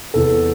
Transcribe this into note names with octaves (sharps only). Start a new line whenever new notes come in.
E2 C3 E3 A4